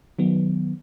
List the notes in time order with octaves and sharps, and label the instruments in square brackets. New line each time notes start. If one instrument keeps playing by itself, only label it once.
[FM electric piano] D#3 F#3 B3